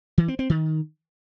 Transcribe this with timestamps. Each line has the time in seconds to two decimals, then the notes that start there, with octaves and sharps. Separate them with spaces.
0.18 E3
0.28 C4
0.39 C4
0.50 D#3